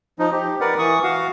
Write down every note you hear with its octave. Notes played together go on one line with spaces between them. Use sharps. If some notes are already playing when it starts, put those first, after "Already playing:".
F3 D#4
G4
A#4 B4 D5 F#5
E3 C#6 D#6
F#4 F5